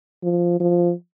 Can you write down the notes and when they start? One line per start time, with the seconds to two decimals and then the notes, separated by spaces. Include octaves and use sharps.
0.23 F3
0.60 F3